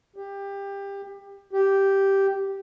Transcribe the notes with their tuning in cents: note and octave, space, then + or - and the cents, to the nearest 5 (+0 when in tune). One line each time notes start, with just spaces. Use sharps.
G4 +20
G4 -5